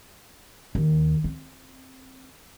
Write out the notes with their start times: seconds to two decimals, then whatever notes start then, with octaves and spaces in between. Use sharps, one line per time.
0.75 D#2
1.24 C4